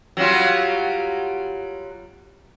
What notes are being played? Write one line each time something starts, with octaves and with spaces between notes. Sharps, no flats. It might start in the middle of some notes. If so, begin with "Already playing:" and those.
F#3 G3 F4